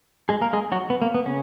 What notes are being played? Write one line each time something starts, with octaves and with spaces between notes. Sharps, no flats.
G#3 G#4
A#3 A#4
G#3 G#4
F#3 F#4
B3
A#3
B3
C#3 C#4